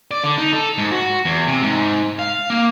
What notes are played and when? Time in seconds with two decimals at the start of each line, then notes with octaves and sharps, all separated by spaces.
0.11 D5
0.24 D3
0.38 D#4
0.53 A4
0.78 G#2
0.91 F#4
1.25 E2
1.48 C3
1.62 G#2
2.19 F5
2.50 A#3